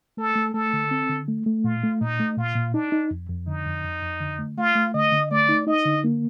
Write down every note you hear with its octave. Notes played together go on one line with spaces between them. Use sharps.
A3 A4
A3
A3 A4
D3
C4
D3
A3
A3
A#2 F4
A3
A#2 D#4
A3
A#2 F4
A#2
D4 D#4
D#4
F2
F2
D3 D#4
F2
F2
F2
D3
A3
A3 F4
A3
D3 D#5
D3
A3 D5
D#4
D#4 D#5
D3
A#3